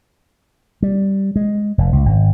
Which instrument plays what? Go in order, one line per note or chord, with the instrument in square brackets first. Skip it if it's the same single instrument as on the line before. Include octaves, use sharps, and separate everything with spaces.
[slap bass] G3
G#3
F1
C#2
G#1